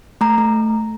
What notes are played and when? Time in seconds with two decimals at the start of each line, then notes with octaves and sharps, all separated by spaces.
0.21 A3 A#5
0.38 A3